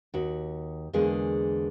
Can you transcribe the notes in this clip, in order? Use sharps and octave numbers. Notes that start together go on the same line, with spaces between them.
D#2 F#4
E2 D3 G#3 A#3 G#4